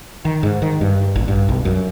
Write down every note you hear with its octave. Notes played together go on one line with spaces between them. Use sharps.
D#3
G#2
D#3
G2
A1
G2
B1
F#2